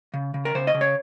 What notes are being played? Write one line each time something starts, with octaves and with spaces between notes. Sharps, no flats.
C#3
C#3
A#4
C#3 C5
D#5
C#3
C#5